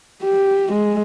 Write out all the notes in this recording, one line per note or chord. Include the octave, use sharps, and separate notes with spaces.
G4
G#3